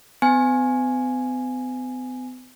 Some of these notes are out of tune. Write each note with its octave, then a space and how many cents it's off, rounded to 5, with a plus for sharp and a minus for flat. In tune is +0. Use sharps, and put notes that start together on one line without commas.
B3 +45 G#5 +0